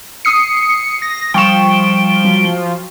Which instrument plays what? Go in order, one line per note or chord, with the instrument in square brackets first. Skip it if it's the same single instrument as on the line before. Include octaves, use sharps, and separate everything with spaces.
[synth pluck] D#6 C7 [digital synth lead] C#7
[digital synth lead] A#6
[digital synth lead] F3 [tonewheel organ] G3 [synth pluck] G5 C#6 E7
[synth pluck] F#3